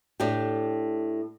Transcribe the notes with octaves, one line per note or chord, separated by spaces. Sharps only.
A2 A3 D4 G4